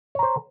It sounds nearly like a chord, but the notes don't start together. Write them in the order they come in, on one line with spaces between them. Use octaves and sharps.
C#5 A#5 C5